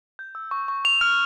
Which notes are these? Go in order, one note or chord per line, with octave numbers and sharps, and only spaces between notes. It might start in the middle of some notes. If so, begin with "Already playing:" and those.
G6
E6
C#6
C#6
C#6 F7
F6